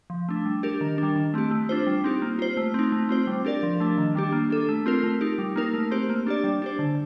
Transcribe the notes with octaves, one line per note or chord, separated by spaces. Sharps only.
F3
A3 D4
G3
D4 G4 A#4
D#3
G3 D4
D#3
A3 C4 G4
A3
D4 F4 C5
G3
C4 D#4 G4
A#3
F4 C5
A3
C4 D#4
A3
C4 F4 C5
G3
D4 G4 A#4 D5
F3
A3 D4
D#3
G3 D4 G4
A#3
D4 A4
A3
C4 F4 A#4
A3
D#4 G4
G3
A#3 D#4 A#4
A3
C4 G4 C5
A#3
D4 G4 D5
G3
D4 G4 C5
D3